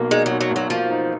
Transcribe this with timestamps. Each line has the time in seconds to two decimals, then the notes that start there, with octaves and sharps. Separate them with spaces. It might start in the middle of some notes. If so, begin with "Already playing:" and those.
Already playing: B1 B2 A#3
0.11 G#3 D#4
0.26 F#3
0.31 B2
0.41 F#3
0.50 B1
0.56 F#3
0.70 F3 A#3
0.90 D#4